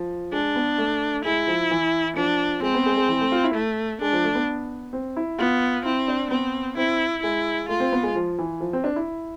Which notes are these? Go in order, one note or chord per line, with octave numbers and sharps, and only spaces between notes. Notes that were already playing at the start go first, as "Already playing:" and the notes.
Already playing: F3
G#3 D4
B3
A3
G#3 E4
F3
E3
F3 D4
G#3 C4
B3
G#3
G#3
E3
A3
F4
E4
A3
G#3 D4
F3
A3
B3
C4
E4
B3 F4
C4 E4
D4
B3 C4
C4 E4
G#3 E4
A3 F4
C4
B3
G#3
F3
E3
F3
C4
D4
E4